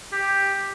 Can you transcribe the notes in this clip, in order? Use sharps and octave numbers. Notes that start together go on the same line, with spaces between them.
G4